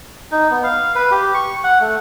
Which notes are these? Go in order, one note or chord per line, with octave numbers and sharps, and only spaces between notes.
D#4
B3
F5
B4
G4
C#6
F#5
A3